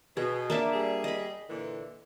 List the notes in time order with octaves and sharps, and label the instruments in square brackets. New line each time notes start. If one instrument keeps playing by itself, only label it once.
[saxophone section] B2 [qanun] G#4
[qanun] A#3 D4 E5
[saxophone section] G3 G#4
[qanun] D#5 B5
[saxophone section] A#2 D3 E3